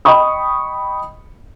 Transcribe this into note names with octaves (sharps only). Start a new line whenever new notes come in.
D#5 G5 B5 C#6 D#6